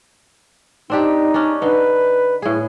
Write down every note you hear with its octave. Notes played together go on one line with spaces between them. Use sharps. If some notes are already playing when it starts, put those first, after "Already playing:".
C4 D4 D#4 G4
C#4 D4
D3 D#4 B4
A2 G#4